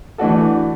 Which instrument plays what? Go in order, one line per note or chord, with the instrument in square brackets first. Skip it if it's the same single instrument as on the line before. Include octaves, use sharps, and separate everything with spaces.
[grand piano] E3 A3 D4 F#4 A4